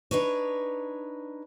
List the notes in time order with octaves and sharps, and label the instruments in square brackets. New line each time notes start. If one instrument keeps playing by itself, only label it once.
[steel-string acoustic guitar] D4 D#4 B4 C#5